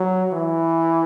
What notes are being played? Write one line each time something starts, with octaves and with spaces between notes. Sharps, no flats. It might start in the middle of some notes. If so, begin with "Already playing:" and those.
Already playing: F#3
E3